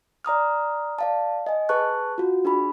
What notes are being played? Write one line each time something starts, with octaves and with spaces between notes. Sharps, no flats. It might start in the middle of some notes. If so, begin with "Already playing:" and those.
D5 A#5 D#6 F6
D5 F5 A5
D#5 G#5
G#4 B4 A5 C#6 F#6
F4 F#4
D4 G#4 B5